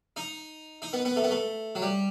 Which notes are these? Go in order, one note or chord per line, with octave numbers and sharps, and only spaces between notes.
D#4
D#4
B3
B3
A3
B3
A3
F#3
G3